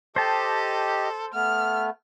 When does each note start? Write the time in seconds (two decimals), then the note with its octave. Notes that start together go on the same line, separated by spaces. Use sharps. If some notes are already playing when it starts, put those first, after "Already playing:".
0.16 G4 A4 C5 D#5 A5
1.33 A3 B3 F6